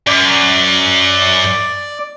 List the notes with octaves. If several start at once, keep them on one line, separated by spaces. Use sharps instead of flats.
F#2 D5